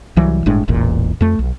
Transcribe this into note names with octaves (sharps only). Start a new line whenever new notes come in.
C2 E3 F#3 G3
G1 A2 G#3 D4
E1 A1 E2 A#2
F2 A3
B1